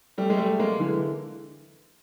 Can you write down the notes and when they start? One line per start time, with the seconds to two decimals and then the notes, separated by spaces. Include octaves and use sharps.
0.18 G3 A3
0.30 G#3
0.38 G3 A3
0.59 G#3 A#3
0.79 D3 E3